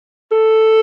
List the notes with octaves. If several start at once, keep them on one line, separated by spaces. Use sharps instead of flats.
A4